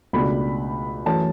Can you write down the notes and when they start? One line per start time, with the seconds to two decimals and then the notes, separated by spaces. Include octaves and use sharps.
0.13 C#2 B2 A3 D4 B5
1.05 F#2 E3 A3 C#4 A5